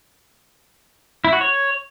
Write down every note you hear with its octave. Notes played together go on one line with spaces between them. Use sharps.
E4
F#4
C#5